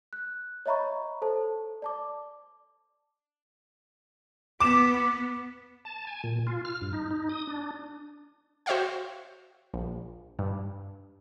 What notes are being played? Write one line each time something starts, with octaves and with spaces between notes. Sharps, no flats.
F#6
C#5 D#5 E5 A#5 B5 C#6
A4 C5 A5
D5 A5 D6
B3 D6 E7
A5
G#5
A#2
F4
F6
G2
D#4
D#4
D#6
D4
F#4 C5 C#5 E5 F5 G5
A#1
G2